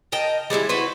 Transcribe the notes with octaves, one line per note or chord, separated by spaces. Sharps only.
A#4 D#5 G5 A5
G3 G#3 C4 E4
E4 F#4 B4 C5